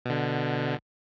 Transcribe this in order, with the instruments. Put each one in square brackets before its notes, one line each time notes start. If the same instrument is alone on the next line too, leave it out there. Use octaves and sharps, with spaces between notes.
[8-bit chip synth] B2 D3